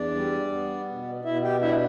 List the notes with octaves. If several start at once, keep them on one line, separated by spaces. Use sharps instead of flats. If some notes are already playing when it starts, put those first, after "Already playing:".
Already playing: E2 D4 D5
G3
B3
B2
B2 E4 E5
G4 G5
D4 E4 E5